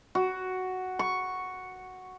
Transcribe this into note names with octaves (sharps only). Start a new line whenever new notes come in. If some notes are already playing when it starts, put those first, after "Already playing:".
F#4
C#6